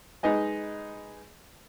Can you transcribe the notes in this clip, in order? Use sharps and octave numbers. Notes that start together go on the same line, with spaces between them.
G#3 D#4 B4 D#5 G#5